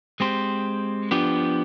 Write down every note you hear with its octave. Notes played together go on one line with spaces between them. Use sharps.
G#3 C4 G4 C5
F3 B3 D4 G4